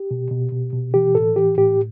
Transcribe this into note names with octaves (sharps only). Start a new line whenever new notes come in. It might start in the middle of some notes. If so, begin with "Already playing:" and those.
Already playing: G4
B2
B2
B2
B2
E3 G4
A2 A4
E3 G4
A2 G4